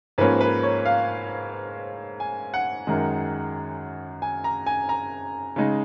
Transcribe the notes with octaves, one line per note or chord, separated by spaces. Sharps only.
G#2 F3 A#3 C#4 B4
B4
C#5
F5
G#5
F#5
F#2 D#3 G#3
G#5
A#5
G#5
A#5
C#3 G#3 D#4